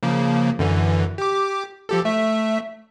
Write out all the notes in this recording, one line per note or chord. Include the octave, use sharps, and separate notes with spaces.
C#3 F3 A#3
F#2 D3 E3
G4 D6
F3 G4 A4
A3 E5